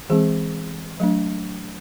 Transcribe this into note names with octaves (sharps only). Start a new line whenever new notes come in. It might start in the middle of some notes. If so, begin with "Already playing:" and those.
E3 G#3 C4 G#4
F#3 A3 D4